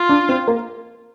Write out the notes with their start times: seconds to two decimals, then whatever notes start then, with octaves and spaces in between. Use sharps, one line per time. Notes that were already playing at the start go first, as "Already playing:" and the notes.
Already playing: F4
0.09 D4
0.29 C4
0.48 A#3